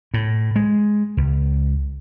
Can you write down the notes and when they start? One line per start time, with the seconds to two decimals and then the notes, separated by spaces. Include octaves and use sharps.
0.14 A2
0.56 G#3
1.17 C#2